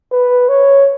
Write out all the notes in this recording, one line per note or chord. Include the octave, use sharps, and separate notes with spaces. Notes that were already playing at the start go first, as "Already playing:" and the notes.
B4
C#5